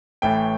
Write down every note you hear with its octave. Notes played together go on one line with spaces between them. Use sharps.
A1 A2 E3 A3 G5